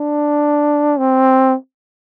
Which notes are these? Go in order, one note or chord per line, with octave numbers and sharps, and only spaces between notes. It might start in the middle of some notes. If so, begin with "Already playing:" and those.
Already playing: D4
C4